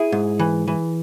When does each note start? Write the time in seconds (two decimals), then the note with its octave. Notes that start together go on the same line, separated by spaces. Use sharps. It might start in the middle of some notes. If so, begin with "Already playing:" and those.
Already playing: E4 G#4
0.12 G#2
0.39 E3
0.68 E3